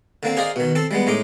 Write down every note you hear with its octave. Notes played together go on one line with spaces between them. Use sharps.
D3 A#3 C4
G#4 A#4 C5 D5 D#5 F5
B2 D#3
C4 A4
G3 G#3 B3
A2 G#3 D#4 D6